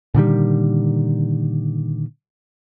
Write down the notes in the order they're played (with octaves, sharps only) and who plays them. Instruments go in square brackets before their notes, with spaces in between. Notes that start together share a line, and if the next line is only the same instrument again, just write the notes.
[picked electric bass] A#2 D3 D#3 G3